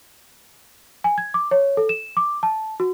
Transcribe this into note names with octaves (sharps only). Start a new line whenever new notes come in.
G#5
G#6
D6
C#5
A4
E7
D6
A5
F#4